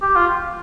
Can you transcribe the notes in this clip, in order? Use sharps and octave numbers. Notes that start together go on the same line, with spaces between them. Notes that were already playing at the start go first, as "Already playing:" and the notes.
G4
F4